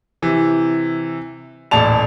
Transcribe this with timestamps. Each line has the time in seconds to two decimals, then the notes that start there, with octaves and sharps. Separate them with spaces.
0.22 C3 E3
1.71 D#1 A1 D5 A5 F7